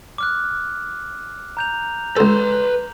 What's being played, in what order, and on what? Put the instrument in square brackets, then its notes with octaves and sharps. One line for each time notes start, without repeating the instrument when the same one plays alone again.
[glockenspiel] D6 F6 F#6
A#5 G6 F7
[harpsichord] C#2 A4 [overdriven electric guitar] B4 C6